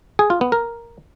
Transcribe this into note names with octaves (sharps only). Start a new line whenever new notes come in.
G#4
F4
B3
A#4